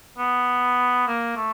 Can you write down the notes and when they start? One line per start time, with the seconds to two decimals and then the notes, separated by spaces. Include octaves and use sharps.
0.18 B3
1.07 A#3
1.37 A3